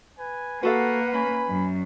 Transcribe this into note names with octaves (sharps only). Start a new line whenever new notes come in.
B4 G#5
A#3 F#4 A4 B4 F5 F#5
C#4 G#5 B5
F#2